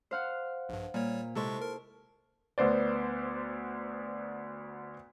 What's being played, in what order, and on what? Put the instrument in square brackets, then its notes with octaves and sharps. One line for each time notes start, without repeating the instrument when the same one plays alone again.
[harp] C5 F5 F#5
[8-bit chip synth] A#1 G2
[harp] A#2 [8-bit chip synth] G3 C#5
[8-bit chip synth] C3 G#3 C#6 [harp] E4 A4 C5
[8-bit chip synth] A#4
[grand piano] D2 B3 C5 D5